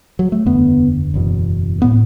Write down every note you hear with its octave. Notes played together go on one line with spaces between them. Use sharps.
F#3
A3
F#1 E2 D3 B3
F#1 E2 B2
A2 B3